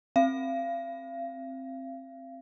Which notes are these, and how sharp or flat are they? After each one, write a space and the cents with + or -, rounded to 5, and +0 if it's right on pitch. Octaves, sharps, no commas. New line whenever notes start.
C4 +15 F5 -35